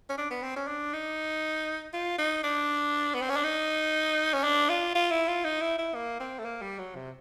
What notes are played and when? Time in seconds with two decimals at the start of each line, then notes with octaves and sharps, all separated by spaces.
0.10 C#4
0.18 D4
0.31 B3
0.43 C4
0.56 C#4
0.67 D4
0.93 D#4
1.93 F4
2.19 D#4
2.44 D4
3.14 B3
3.22 C4
3.29 C#4
3.36 D4
3.44 D#4
4.33 C#4
4.44 D4
4.69 F4
4.95 F4
5.11 E4
5.28 F4
5.45 D#4
5.62 E4
5.78 E4
5.95 A#3
6.20 C4
6.39 A3
6.45 A#3
6.62 G3
6.79 F#3
6.95 C3